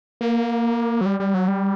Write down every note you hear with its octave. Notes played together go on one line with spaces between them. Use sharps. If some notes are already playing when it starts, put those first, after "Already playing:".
A#3
F#3
G3
G3
F#3
G3